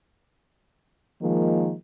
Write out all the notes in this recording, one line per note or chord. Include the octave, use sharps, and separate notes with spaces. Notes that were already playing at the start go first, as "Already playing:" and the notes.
D#3 F3 G#3 A#3